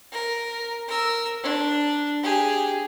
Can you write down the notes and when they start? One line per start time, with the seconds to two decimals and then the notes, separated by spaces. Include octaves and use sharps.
0.12 A#4
0.88 A#4 E6
1.43 D4
2.23 G4 G#4